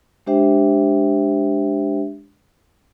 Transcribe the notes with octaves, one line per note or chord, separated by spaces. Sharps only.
G#3 D4 G4 C5 E5 G5